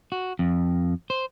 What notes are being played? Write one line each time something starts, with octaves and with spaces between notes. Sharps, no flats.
F#4
F2
C5